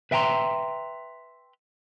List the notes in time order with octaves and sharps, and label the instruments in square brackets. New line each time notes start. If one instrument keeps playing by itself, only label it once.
[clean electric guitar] B4 E5 G5 A5 A#5 C6